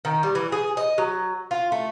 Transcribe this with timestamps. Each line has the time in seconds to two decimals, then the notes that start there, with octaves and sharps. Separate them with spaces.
0.05 D#3
0.23 G3
0.35 E3
0.52 G#4
0.77 D#5
0.98 F#3
1.51 F4
1.72 A3